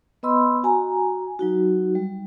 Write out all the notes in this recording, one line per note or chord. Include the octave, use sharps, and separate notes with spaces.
B3 B4 D#5 B5 C6 E6
F#4 G#5 A#5
F#3 D#4 F#4
G3